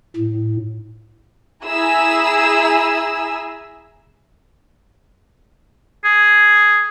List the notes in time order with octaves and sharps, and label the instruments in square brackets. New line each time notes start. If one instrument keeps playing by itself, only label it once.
[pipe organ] A2
[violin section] E4 G#4 G#5 A#5 E6
[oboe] G#4